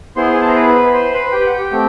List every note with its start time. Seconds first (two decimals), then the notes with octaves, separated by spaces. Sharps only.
0.16 B3 E4 G#4 C5 C6
0.34 G#5
0.41 A5
0.48 A#5
0.55 B4 B5
0.93 C5 C6
1.13 B4 B5
1.32 G4 G5
1.46 F#5
1.52 G4 G5
1.72 A3 C4